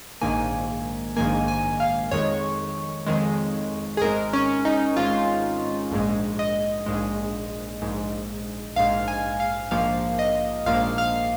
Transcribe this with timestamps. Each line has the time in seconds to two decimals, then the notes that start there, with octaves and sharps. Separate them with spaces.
0.21 A#1 G#2 D#3 A#3 G#5
1.16 A#1 G#2 D#3 A#3 G#5
1.48 G#5
1.80 F5
2.11 F2 D#3 G#3 C#5
3.06 F2 D#3 G#3
3.97 G#4
4.01 G#1 G#2 G#3 A#4
4.33 C#4
4.65 D#4
4.97 G#1 G#2 G#3 F4
5.91 A#1 G#2 G#3
6.39 D#5
6.86 A#1 G#2 G#3
7.82 A#1 G#2 G#3
8.76 A#1 G#2 G#3 F5
9.08 G#5
9.40 F5
9.71 A#1 G#2 F3 A#3 F5
10.19 D#5
10.66 A#1 G#2 F3 A#3 F5
10.98 F5